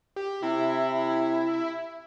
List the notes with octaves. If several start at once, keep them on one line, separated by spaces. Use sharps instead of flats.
G4
C3 E4